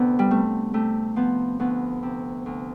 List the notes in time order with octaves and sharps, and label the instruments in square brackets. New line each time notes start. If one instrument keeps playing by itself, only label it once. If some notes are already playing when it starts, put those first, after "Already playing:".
Already playing: [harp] D2 C3 B3 D4
G3
C3 A3
C3 A3
F3 B3
D2 B3
C3
D2